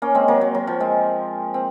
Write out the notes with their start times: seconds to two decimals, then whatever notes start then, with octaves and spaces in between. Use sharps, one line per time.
0.02 A#3 C#4
0.15 G#3 C4
0.28 F#3 A#3
0.41 F#3
0.55 F#3
0.67 F3
0.80 G#3 C4
1.54 C4